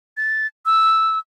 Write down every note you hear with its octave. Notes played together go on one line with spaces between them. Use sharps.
A6
E6